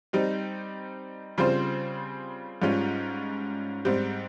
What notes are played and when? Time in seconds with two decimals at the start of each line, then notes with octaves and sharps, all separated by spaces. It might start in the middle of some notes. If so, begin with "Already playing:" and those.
0.13 G3 C4 D#4 G4
1.38 C#3 G3 C4 F4 C5
2.62 G#2 G3 C#4 F4
3.85 G#2 G3 C4 G4